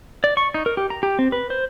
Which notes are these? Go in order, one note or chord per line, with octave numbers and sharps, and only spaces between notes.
D5
C#6
D#4
A#4
G4
A#5
G4
C4
B4
C5